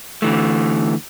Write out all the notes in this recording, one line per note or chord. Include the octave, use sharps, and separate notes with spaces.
D3 E3 A3